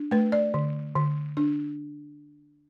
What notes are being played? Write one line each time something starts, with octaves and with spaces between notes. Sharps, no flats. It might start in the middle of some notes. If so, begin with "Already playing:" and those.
Already playing: D4
A3 B4
D5
D3
D3
D4